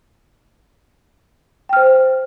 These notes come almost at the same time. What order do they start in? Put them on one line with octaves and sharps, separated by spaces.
G5 F6 C5